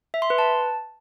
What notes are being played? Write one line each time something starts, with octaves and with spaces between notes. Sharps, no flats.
E5
C6
B4
A5